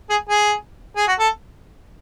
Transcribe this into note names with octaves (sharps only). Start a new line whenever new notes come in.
G#4
G#4
G#4
F#4
A4